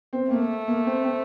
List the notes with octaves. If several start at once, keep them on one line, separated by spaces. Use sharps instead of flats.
C4
A3 A#3
A#3
C4
C4